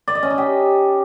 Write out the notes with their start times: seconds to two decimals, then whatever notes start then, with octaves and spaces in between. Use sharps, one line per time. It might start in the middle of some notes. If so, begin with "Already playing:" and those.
0.08 D5
0.15 D#5
0.23 C#4
0.30 D#4
0.38 G4